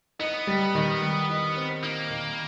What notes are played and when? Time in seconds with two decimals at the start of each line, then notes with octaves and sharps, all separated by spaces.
0.19 B3 D#4
0.47 G3
0.75 D#3
1.01 G3
1.30 D#4
1.56 C4
1.83 A#3 D#4
2.11 D#3